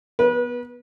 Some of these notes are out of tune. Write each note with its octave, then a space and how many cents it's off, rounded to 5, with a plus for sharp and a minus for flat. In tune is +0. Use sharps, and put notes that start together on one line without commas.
B3 -5 B4 -35